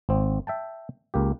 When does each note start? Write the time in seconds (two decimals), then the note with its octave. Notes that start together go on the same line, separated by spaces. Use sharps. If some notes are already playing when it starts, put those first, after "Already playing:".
0.09 G#1 C4
0.47 E5 G5 A5
1.14 C#2 A#3 G4